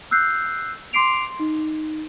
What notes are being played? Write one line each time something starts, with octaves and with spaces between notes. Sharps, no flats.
E6 F#6 G6 C7
C6 D6 C7 D7 F7
D#4